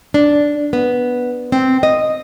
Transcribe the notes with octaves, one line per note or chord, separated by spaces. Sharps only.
D4
B3
C4
D#5